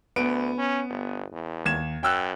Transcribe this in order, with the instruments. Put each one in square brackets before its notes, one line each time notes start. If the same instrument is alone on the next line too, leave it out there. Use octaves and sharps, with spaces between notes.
[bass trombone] D2 [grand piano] B3 D7
[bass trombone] C#4
G1
E2
[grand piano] D#2 G#6 E7
[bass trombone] F#2 [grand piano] G5 E6 F#6